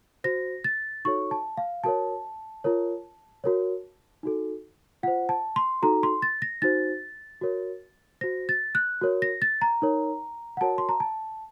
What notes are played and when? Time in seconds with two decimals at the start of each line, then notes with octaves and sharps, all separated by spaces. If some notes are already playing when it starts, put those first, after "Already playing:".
0.24 F#4 C5 A#6
0.64 A6
1.05 D#4 F#4 A4 C#5 C#6
1.31 A5
1.57 F5
1.84 F#4 A#4 C#5 A5
2.64 F4 A#4 C#5
3.44 F#4 A#4 C#5
4.23 D#4 F#4 A4
5.03 F4 C5 F#5
5.29 A5
5.56 C6
5.82 D#4 F#4 A4 A#5
6.03 C6
6.22 A6
6.42 A#6
6.62 D#4 F#4 C5 A6
7.42 F#4 A#4 C#5
8.21 F#4 C5 A#6
8.49 A6
8.75 F#6
9.01 F#4 A#4 C#5
9.22 A#6
9.42 A6
9.62 A#5
9.82 D#4 A#4 C#5
10.57 F#5
10.61 F#4 A#4 C#5 A5
10.78 C6
10.89 A#5
11.00 A5